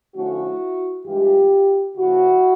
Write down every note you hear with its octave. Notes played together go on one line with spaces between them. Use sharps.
D3 F3 A3 C#4 E4 F#4
G2 E3 G#3 F4 G4
C#3 F3 A#3 E4 F#4